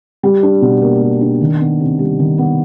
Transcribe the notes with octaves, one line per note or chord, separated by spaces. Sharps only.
G3
D4
B2
A#3
G3
D4
D#3
B3
C3
G3
D#3
B3